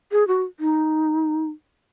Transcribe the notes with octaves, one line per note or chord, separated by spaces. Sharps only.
G#4
F#4
D#4